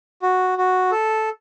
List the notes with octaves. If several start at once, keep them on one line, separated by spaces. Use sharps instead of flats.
F#4
F#4
A4